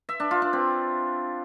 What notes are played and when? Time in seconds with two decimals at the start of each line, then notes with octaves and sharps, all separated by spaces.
0.09 E5
0.20 D4
0.31 F4
0.42 D4
0.53 C4